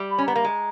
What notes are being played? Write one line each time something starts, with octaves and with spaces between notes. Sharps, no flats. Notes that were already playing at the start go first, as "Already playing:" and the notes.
Already playing: G3
B5
C#4
B3 A#5
A#3
G#3